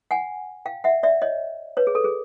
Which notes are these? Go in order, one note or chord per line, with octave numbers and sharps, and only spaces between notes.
F#5 G#5
F5 G5
E5 F#5
D5 E5
C#5 D#5
B4 C#5
G#4
A4
G#4